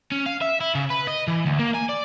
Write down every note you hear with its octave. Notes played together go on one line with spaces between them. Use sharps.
C#4
F5
E5
E4
C#3
B4
D#5
E3
D2
A#3
G#5
D5